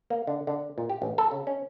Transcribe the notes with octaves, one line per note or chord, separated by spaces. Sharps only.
A#3
D3
D3
A#2
G4
A1
A4
C#3
C#4